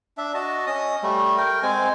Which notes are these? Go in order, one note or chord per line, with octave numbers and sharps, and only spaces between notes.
D4 E5
F#4 D#5 A5
C#4 D#5 D#6
G3 A3
A#4 G5
G#3 C4 G#5